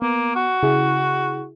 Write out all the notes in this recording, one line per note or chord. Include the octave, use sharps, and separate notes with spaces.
A#3 B3
F#4
C#3 E4 G#4